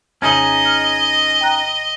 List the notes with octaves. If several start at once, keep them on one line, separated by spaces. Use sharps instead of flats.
F2 C#3 C#4 D#4 G#4 D#5
F6
G5 A#5 F#6